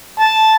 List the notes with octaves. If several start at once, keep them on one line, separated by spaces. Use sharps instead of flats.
A5